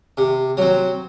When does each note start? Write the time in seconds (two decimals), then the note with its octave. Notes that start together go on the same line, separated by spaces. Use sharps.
0.17 C3
0.57 F#3 C4